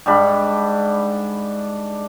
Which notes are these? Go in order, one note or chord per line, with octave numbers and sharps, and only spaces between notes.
G#2 G3 D4 B5